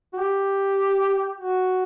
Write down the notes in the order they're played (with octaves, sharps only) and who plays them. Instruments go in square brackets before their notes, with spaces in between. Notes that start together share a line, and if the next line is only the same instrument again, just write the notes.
[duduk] F#4
G4
F#4